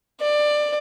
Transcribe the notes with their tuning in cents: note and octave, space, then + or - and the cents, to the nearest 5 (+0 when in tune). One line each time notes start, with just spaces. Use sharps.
D5 +20